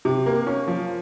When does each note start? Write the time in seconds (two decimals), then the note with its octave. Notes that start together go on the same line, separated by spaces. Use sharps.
0.05 C3
0.26 A#3
0.47 C#4
0.68 F3